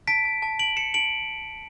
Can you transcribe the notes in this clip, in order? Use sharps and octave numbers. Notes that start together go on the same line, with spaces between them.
A5 B6 D7
A5
A5
A5 D7 F#7
A5 C#7 E7
A5 D7 F#7